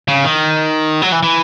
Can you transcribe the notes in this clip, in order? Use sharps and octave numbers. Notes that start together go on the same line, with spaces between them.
C#3
D#3
F#3
E3
E3